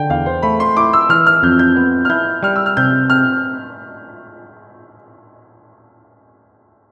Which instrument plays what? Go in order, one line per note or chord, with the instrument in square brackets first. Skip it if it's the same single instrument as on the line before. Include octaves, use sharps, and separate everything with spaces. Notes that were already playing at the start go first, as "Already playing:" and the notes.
Already playing: [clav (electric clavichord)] D3 [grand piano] G5
[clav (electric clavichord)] E2 [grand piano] F5
[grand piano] C5
[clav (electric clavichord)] A3 [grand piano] B5
[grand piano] C6
[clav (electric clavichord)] E4 [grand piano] D6
[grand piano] E6
[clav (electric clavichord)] E3 [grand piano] F6
[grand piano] F6
[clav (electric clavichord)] F2 [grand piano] G6
[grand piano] G6
[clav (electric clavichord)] B3
[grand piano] F6
[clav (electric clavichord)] E4 [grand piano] G6
[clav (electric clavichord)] G3 [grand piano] F6
[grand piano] E6
F6
[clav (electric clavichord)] C3 [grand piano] G6
[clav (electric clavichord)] C4 [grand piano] F6